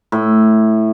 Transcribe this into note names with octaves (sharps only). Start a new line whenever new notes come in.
A2